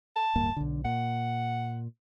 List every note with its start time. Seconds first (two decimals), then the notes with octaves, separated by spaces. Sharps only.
0.16 A5
0.36 D1 G2 A#3
0.57 B1 D3
0.85 A#2 F#5